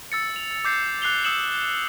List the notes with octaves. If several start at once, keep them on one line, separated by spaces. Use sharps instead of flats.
E6 A6 C#7
F7
D6 G6 C7
D6 F#6 C7 F7 G7
D#6 E6 G6 C#7 E7 F#7